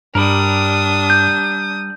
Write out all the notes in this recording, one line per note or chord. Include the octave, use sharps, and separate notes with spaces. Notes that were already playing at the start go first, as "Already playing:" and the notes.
G2 G3 D4 A#4 B5 D#6
G6